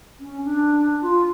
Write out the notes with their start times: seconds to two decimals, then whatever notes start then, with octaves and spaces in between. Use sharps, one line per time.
0.20 C#4
0.44 D4
1.02 F4